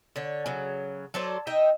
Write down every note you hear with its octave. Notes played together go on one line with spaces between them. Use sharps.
D3 C#5
C#3 F#3
F#3 A4 C5 D5
D#4 D#5 E5 G5